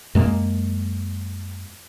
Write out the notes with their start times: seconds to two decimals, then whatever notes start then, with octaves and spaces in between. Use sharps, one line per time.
0.15 F#2 G#3 A#3